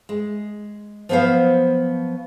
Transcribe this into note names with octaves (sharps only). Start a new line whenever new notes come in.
G#3
F3 F#3 B3 C5 F5